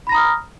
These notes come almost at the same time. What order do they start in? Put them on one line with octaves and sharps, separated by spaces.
B5 A#6 A#5 D#6 F6